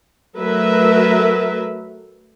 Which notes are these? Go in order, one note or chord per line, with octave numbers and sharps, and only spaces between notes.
F#3 A3 A#4 B4 E5